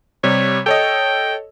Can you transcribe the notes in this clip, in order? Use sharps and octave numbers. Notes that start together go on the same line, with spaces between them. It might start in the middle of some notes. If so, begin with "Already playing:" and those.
C3 G3 C#5
A4 C#5 D#5 G5